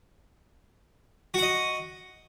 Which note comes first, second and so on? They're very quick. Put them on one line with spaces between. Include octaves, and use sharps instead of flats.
F#4 F#5 D#5